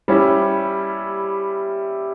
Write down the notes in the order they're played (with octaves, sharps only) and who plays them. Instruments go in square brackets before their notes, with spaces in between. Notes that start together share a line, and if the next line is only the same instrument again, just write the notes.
[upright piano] G3 C#4 E4